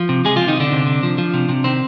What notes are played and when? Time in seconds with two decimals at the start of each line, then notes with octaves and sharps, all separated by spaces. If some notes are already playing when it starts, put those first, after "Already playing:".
Already playing: F3
0.09 C3
0.25 C3 G#3 G#4
0.36 C3 F3 F4
0.48 D#3 D#4
0.57 F3
0.60 D3 D4
0.72 C3
0.87 C3
1.03 F3
1.18 F3
1.34 C3
1.49 C3
1.64 D#3 C4